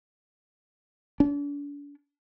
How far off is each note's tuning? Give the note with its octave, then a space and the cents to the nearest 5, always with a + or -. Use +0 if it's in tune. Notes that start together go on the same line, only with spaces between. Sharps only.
D4 -40